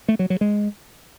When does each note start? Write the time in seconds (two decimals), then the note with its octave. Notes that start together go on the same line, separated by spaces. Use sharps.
0.08 A3
0.19 F#3
0.30 F#3
0.41 G#3